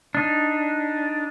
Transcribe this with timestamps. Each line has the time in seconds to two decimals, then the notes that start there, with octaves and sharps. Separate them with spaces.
0.15 D4 D#4